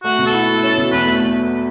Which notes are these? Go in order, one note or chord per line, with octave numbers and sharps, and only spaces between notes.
A3 F#4
B2
A4
E4
A3
C#4
B2
E2 B4
A3